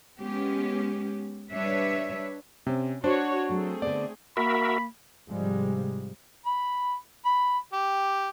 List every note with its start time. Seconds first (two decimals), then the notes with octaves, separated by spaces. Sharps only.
0.20 G#3 B3 C#4 G4
1.52 G3 D4 B4 C#5 E5
2.67 C3 C4 C#4
3.04 D4 F#4 C5 C#5
3.49 F#3 A3 C4 F#4 G#4
3.82 D3 B3 D5
4.37 A#3 F#4 A#4 E5 B5
5.28 G#2 C3 F3 G3 G#3
6.46 B5
7.25 B5
7.73 G4